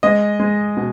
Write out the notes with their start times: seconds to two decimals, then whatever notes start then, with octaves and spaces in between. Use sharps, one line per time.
0.03 G#3 D#5
0.40 G#3
0.77 B2